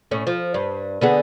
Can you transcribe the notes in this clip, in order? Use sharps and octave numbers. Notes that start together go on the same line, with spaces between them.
A2 C#4
F3
G2
D3 B3 G#4